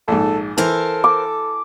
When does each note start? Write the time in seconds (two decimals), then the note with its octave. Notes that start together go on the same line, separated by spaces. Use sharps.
0.08 A#1 G#2 A4
0.58 E3 A4 A#4 C5 F5
1.04 D6